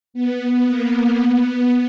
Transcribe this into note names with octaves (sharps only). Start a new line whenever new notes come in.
B3
A#3
B3